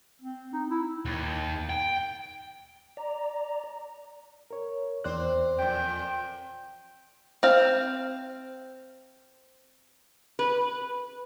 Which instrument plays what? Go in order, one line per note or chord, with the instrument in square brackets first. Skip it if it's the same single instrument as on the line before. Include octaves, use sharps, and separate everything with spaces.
[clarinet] C4
D#4
E4
[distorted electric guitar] D#2
G5
[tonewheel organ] D5 A#5
[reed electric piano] A#4 C#5
[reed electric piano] E2 D5 F#6 [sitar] C4 C5
[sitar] F2 A#2 [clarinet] G5
[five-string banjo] C4 F5
[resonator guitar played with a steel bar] B4